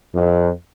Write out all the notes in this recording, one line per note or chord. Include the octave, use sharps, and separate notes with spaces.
F2